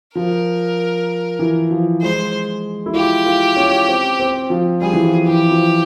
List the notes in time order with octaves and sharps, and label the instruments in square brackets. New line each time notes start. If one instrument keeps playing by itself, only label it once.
[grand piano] F3 [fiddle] A#4
[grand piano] E3
F3
[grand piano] G#3 [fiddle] C5
[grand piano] E4
[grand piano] F4 [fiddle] G4
[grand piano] F4
C#4
C4
C4
F3
[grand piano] G3 [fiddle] G#4
[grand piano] E3
F3
[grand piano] E3 [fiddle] G4
[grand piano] F3